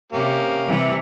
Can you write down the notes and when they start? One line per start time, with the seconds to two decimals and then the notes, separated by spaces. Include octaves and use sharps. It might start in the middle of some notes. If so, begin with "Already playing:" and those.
0.12 C3 A#3 C#4 G4
0.67 C3 E3 G3